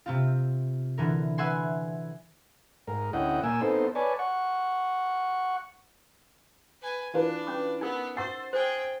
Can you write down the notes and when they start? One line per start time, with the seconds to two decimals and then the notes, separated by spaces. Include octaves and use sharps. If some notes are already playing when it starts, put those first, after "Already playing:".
0.06 C3 C4 F4
0.98 D3 E3 A#4
1.38 B4 E5 F#5 G#5 C6
2.87 G#2 A#4
3.13 D2 C#4 E4 D#5 F#5 G5
3.43 A#2 A#3 G#5 E6
3.61 B3 C4 D#4 A4 C5
3.95 B4 C#5 D5 G#5 A5
4.19 F#5 C#6
6.81 B4 G#5
7.14 E3 D4 F4 B4
7.47 C#4 D6
7.81 B3 D#4 A#4
8.17 C5 F#5 C6 E6 A6
8.53 G#4 C5 G5